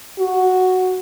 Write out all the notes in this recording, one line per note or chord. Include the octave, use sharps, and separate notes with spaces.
F#4